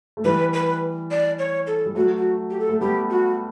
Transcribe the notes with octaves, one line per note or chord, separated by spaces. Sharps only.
A3
E3 G3 B4
B4
D5
C#5
A4
G3
F#3 A3 F#4
F#4
G4
A4
A3
G3 B3 G4
F#4